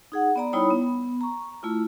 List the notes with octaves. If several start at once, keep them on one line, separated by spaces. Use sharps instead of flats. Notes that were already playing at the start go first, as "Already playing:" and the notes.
D#4 G#4 F#5
B3 D5 A#5
G3 D#4 E4 C#5 B5 D#6
B3
A#5 C#6
A3 E4 F4